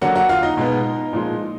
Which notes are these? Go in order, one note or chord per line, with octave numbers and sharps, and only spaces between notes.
D3 F#3 A#3 F#4 F#5
F#4 F#5
F4 F5
D#4 D#5
B2 G#3 B3
A#2 F3 G#3